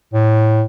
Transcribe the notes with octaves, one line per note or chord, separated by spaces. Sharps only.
A2